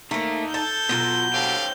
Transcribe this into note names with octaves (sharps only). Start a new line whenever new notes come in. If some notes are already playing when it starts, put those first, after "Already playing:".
A3 A#3 D#4 F5 A#5
A4 A5 G6
B2 F3 F#3 B3 F4
G4 A4 C5 C#5 F5 G5